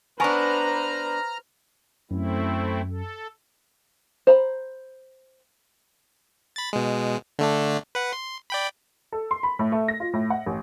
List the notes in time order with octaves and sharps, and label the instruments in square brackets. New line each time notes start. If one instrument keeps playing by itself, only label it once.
[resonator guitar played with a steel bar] B3 D4 [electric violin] B4 C5 [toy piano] G#5 C#6 [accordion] A#5 F6
[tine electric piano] F#2 [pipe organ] A3 C4 E4
[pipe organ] A4
[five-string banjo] C5 A#5 B5
[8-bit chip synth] B5 A6
B2 G#3
D3 A3 D4
B4 F#5
C6
D5 G5 B5
[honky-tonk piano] A4
C6
B5
A2
A3
A#6
F4
A2
F#5
A1